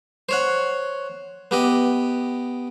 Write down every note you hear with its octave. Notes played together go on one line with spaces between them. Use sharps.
C5 C#5 F#5
B3 G4 D#5